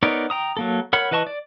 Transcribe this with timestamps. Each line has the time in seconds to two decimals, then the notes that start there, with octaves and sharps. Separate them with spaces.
0.03 B3 D#4 A#4 C#5 D5
0.30 G5 A#5 D#6
0.57 F#3 A#3 A4
0.93 A#4 C#5 F#5 B5
1.11 E3 B4 D#5 A5 C#6
1.27 D5